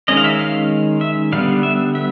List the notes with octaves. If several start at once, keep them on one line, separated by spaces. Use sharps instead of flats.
D#3 G#3 C#4 D#5
F5
E5
F5
E5
D3 G3 B3 F5
E5
E5